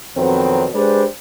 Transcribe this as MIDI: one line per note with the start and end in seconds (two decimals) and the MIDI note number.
0.16 0.67 41
0.16 0.67 47
0.16 0.67 51
0.16 0.67 54
0.16 0.67 59
0.16 0.67 60
0.73 1.04 56
0.73 1.04 62
0.73 1.04 67
0.73 1.04 71
0.73 1.04 72
0.73 1.04 74